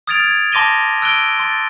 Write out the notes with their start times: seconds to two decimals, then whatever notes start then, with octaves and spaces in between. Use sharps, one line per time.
0.07 D#6 F6 G#6 A6 D7 F7
0.20 F6 G#6
0.52 A5 C6 D6 A#6 D#7 G7
1.02 E6 F#6 D7 D#7 G7
1.39 C6 A6